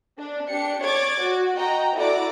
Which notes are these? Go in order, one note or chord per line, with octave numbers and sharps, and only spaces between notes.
D4
D4 G4 C#7
C#5 D5 D6 G#6 A6
F#4
F#4 D#5 G5 A#5
E4 F#4 A4 D5 A#5 D6